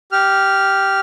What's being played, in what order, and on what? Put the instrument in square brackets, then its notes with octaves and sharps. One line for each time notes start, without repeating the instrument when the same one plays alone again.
[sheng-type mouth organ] G4 F6